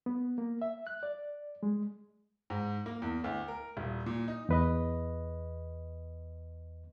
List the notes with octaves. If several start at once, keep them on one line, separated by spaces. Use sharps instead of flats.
B3
A#3
E5
F#6
D5
G#3
G#2
A#3
E2
D2
A#4
D#1
A#2
D#4
E2 B4 D#5